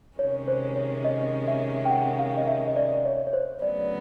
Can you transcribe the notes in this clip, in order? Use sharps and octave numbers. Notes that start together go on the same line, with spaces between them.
C3 D#3 G#3 C#4 C#5
C5
C#5
D#5
E5
G5
F#5
F5
D#5
E5
D#5
D5
C#5
C#5
C5
D2 C#3 F#3 B3 D5